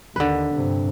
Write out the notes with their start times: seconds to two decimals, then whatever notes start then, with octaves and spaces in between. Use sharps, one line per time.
0.16 D#2 D3 B4
0.53 G2 C3